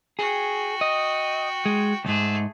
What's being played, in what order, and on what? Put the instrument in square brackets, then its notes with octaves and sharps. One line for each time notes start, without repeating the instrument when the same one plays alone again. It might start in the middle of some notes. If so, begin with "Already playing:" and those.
[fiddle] F#4 G5 [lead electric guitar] G#4
[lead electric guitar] D#5
G#3
[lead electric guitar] C#2 G#2 [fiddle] A3 G#4